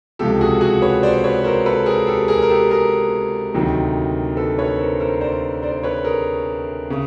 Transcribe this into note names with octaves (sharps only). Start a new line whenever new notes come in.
C#2 C3 F3 G4 A4
F#4 G#4
F#4 G#4
B4 C#5
C5 D5
B4 C#5
A#4 C5
A4 B4
G#4 A#4
G4 A4
G#4 A#4
A#4
G4 A4
G#4 A#4
D2 C3 D#3 F#3
A4 B4
B4 C#5
A#4 C5
A#4 C5
C5 D5
C5 D5
B4 C#5
G#4 A#4
C#3